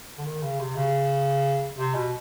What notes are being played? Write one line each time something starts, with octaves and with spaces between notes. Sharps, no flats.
D3
D#3
C#3
C3
C#3
C3
B2